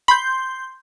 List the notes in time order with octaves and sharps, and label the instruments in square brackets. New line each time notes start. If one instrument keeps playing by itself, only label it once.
[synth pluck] B5 [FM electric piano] C6 G6